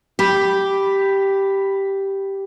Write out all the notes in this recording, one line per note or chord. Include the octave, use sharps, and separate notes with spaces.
G4 B5 B6